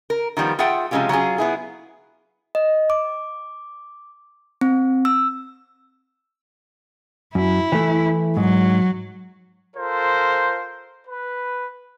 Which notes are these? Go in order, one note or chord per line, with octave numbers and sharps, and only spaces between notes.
A#4
D#3 F3 G3 B3
F4 G#4 E5 F#5 G5
C3 F3 G#3 C#4 F4 G4
F#3 C#4 F4 G#4
B3 E4 G#4
D#5
D6
C4
E6
F#2 E4
E3 A3
G#2 F#3
F4 A4 A#4 C5
B4